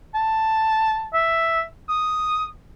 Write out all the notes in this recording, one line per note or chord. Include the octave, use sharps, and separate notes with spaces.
A5
E5
D#6